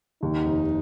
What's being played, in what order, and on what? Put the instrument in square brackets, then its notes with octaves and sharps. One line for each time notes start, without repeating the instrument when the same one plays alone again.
[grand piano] D#2 [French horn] D#4
[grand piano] F1